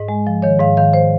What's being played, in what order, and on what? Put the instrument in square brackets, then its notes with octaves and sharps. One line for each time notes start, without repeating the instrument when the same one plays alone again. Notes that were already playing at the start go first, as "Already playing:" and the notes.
Already playing: [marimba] G#2 D#5
G#3
F3
D#3 C#5
G#2 F5
D#3 F5
C5